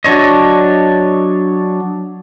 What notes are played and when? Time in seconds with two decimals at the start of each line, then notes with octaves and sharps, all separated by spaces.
0.04 F#3 D4 C#5 D#5